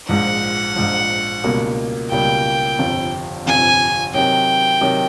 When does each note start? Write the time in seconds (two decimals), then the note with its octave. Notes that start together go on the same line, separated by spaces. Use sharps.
0.09 A#1 G#2 F3 F#5
0.76 A#1 G#2 F3
1.44 C#2 B2 G3 A#3
2.11 C#2 B2 G3 A#3 G5
2.79 G1 F2 C3
3.46 G1 F2 C3 G#5
4.14 C3 D#3 F#3 G5
4.81 C3 D#3 F#3